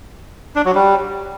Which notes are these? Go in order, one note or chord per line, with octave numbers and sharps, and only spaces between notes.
D4
F#3
G3